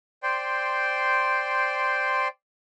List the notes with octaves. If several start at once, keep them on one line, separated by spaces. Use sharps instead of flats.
C5 D5 G5 C6